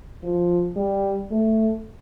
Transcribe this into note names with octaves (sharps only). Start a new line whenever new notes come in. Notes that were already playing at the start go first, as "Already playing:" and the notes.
F3
G3
A3